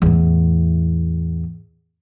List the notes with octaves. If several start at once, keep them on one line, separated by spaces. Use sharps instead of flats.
E2 A2